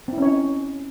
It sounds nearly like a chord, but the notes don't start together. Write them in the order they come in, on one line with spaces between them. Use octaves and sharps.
C4 E4 C#4 C#5 D#4